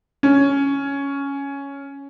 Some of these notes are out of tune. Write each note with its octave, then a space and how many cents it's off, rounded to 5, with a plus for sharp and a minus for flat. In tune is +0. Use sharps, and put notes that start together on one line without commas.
C#4 +5